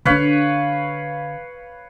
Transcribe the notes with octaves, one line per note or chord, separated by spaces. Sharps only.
D3 D4 B4 C#5 F5